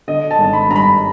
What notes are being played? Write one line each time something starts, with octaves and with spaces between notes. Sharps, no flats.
D3 D#5
A5
G#1
B5
G2 A#5
B5